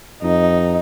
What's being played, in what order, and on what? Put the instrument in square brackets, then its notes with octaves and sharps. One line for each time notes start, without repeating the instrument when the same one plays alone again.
[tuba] F2 [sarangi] D#4